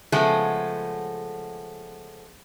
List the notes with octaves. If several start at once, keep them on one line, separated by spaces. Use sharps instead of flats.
C#3 F3 G#3 A3 B3